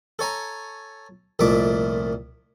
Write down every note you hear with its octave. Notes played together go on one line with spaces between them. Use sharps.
A4 C#5 G#5 A#5
C2 F2 A#2 A3 E5 D6